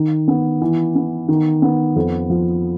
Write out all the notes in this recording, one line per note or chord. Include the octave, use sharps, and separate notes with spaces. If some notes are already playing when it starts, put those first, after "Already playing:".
Already playing: D#3
B3
E3
B3
D#3
B3
F2
F3